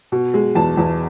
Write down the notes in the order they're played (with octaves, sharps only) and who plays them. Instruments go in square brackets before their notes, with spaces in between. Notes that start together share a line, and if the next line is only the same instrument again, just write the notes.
[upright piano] B2
G#3
E2 A5
E2